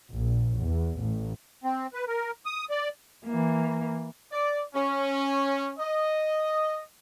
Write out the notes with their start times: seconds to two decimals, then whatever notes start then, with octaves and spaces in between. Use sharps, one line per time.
0.12 A#1
0.60 E2
0.97 A1
1.64 C4
1.94 B4
2.07 A#4
2.46 D#6
2.70 D5
3.26 E3 A#3
4.32 D5
4.75 C#4
5.79 D#5